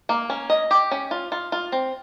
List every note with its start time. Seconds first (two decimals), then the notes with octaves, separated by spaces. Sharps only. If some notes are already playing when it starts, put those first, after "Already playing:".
0.09 A#3
0.30 C#4
0.50 D#5
0.71 G4
0.91 C#4
1.11 F4
1.32 F4
1.52 F4
1.72 C4